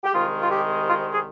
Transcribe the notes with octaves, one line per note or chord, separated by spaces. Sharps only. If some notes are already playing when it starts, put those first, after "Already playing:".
G4
C2 C3 D#3 G#3 F4
F4
G4
F4
G#4